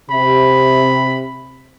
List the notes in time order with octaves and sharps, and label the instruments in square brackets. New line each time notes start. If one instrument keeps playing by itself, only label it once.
[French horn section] C3 [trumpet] B5